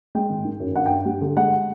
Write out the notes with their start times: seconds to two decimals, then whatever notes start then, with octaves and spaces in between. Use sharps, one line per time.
0.15 G#3 G5
0.30 G#1
0.45 D#3
0.60 F#2
0.76 G2 F#5
0.86 G2 G5
1.06 G3
1.21 D3
1.37 G#3 F#5